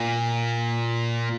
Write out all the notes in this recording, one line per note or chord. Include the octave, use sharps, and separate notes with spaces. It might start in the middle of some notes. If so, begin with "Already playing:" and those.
Already playing: A#2